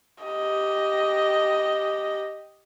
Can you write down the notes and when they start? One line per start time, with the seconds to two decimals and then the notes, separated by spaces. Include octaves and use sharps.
0.24 G4 D#5